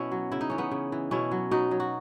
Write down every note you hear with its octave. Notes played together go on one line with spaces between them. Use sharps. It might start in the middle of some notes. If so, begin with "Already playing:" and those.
Already playing: B2 B3 C#4 E4
F#3
C#3 E4
D#4
E3 C#4
B3 D#4
C#3
E3
B2 C#4 E4
F#3
B2 D#4 F#4
F#3
F#4